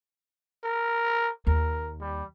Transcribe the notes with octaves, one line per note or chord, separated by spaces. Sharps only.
A#4
D#2 A#4
G3